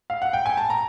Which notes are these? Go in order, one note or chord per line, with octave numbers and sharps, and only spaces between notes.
F5
F#5
G5
G#5
A5
A#5